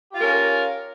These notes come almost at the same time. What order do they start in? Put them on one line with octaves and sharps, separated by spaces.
G4 F4 A#4 C#4